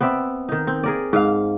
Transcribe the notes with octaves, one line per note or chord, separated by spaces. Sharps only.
B3 C4 D5 E5
D#3 D#4
C4
G#4 A#4 D5
G#2 F5